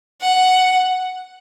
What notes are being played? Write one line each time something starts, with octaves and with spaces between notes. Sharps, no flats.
F#5